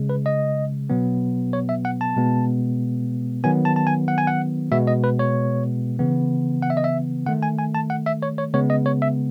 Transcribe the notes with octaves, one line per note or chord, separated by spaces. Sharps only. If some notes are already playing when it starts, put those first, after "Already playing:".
Already playing: C#3 G#3
B4
D#5
B2 F#3 B3
C#5
E5
F#5
A5
B2 G#3 B3
D#3 F#3 B3 G#5
A5
A5
G#5
F#5
G#5
F#5
B2 G#3 B3 E5
D#5
B4
C#5
C#3 E3 B3
F#5
E5
D#5
E5
D#3 A3 F#5
G#5
G#5
A5
F#5
E5
C#5
C#5
C#3 G#3 B3 C#5
D#5
C#5
E5